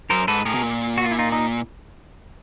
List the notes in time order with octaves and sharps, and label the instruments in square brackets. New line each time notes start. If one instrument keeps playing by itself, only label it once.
[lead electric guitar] F#2 [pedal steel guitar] A#4 C5
[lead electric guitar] G#2 [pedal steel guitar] A4 B4
[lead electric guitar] A2 [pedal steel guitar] G#4 A#4
[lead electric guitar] B2
A#2
[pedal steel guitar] F#4
F4
E4
D#4 F4
D#4